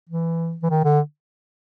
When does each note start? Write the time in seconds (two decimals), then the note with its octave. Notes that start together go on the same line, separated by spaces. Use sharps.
0.09 E3
0.63 E3
0.70 D#3
0.84 D3